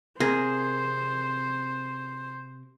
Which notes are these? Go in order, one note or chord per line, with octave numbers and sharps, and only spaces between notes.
C3 G#4 A#4 C5